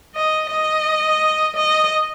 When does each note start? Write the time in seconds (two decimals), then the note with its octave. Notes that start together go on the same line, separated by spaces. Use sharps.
0.15 D#5
0.50 D#5
1.56 D#5